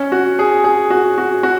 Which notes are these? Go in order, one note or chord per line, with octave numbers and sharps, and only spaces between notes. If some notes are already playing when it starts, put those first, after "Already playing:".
Already playing: C#4
F#4
G#4
G#4
F#4
F#4
F#4